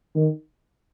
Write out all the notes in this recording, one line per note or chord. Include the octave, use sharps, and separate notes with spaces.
D#3